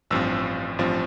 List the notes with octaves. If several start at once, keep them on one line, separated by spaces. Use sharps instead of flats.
A1 G2 F3 C4 E6
A1 G2 F3 C4